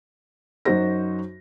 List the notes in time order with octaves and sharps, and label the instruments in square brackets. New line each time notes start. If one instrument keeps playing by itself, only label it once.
[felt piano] F#2 D#4 F#4 C5 A#6